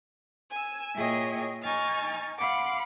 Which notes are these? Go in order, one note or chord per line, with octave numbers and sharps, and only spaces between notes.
G#5 E6
A#2 E4 G#4 C#5 D#5 G5
D#4 G#5 C#6 F6 A6
F5 F#5 B5 C6 D6